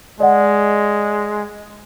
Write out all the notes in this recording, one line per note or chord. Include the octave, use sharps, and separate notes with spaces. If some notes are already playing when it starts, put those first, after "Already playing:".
G#3 D5 D#5 F#5